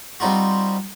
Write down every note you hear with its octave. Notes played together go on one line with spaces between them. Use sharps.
G3 C4 D#4 F4 F#4